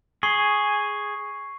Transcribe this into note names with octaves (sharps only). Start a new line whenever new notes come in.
G#4 C#6 C7